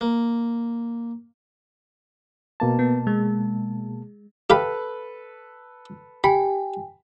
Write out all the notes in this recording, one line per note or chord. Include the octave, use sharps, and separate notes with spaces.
A#3
B2 A#3 A5
B3
G#3
G4 A4 B4 F5 B5
G4 G5 G#5 B5